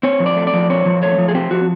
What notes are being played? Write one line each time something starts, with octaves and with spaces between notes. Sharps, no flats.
C4 C#5
F3
D5
A3
D5
F3
C4 C#5
F3
A3 C#5
F3
G#4
C4 G4
F3 F#4